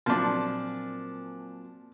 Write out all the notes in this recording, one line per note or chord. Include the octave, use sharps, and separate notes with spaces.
A#2 F3 F#3 C4 D4